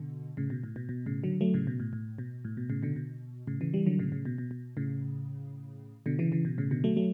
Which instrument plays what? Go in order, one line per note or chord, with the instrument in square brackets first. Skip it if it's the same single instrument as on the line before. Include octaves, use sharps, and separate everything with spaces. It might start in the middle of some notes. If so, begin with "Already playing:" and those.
Already playing: [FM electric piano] B2 D3
A2 C#3
B2
A2
B2
B2
A2 C#3
D3 F#3
F#3 A3
A2 C#3
B2
A2
A2
B2
A2
B2
A2 C#3
B2 D3
B2
A2 C#3
C#3 E3
E3 G3
D3 F#3
A2 C#3
A2 C#3
B2
B2
B2
A2 C#3
B2 D3
C#3 E3
C#3 E3
B2
A2 C#3
B2 D3
F#3 A3
F#3 A3